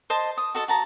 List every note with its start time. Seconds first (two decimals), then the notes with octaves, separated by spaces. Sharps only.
0.10 C5 D#5 A5 C6
0.38 D#6
0.55 F#4 A4 D#5 A5
0.68 F#4 A5 A#5